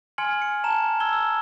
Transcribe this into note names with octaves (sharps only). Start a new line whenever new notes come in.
G#5 C6 F6 G#6 C#7 F#7
C#7
A5 A#5 E7
E6 G#6 G7
E6